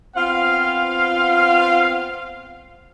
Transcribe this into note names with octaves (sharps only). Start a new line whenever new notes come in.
B3 C4 F4 F5